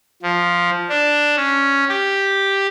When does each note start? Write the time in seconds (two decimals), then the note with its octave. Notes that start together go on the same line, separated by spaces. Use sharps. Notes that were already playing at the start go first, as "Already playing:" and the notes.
0.23 F3
0.90 D4
1.37 C#4
1.89 G4